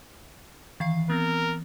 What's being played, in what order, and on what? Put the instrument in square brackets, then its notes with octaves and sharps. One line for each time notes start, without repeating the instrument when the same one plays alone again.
[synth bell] D#3 F5 C7 [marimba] E3
[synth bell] B3 C4 [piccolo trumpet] A#4